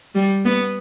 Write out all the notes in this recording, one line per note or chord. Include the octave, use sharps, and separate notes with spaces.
G3
B3